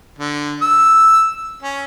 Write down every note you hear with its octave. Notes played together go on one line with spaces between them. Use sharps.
D3
E6
C#4